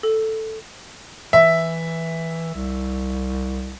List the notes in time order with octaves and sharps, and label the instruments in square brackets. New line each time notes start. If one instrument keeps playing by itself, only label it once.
[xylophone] A4
[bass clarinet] E3 [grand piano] E5
[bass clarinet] C2